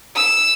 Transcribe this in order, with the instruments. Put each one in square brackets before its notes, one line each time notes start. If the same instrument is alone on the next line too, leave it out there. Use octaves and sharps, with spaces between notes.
[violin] E6